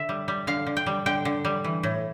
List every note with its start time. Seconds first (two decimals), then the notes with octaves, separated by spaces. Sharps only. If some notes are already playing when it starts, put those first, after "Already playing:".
Already playing: D3 E5
0.09 G3
0.28 G3
0.47 D3 F5
0.67 D3
0.77 G5
0.86 G3
1.06 D3 G5
1.25 D3
1.45 G3
1.64 E3
1.83 A2